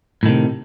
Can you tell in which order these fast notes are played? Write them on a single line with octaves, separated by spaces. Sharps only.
A2 D#3 C3